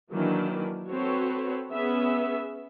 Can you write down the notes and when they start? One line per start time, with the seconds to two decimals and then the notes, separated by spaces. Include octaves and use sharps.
0.12 D#3 E3 F#3 A#3 D4
0.90 C4 F#4 A4 B4 C#5
1.72 B3 C#4 G#4 E5